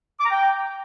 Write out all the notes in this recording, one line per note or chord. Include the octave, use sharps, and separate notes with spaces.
D6
A#5
G5